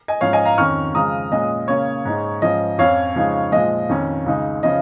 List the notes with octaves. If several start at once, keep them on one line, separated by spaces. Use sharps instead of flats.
D#5 G#5
G#2 F3 G#3 C#4 C#5 F5
D#5 G#5
F5 A#5
F2 D#3 C#4 C#6 F6
C#3 F3 G#3 A#5 D#6
A#2 G#3 C#4 D#5
C#3 A#3 C#4 C#5
G#2 G#3 D#4
G#2 F3 C#4 D#5
F2 F3 C#4 C#5 F5
C#3 F3 G#3 D#4
A#2 F3 G#3 D#5
F2 D#3 C#4
C#2 C#3 G#3 D#4
C#3 F3 C#4 D#5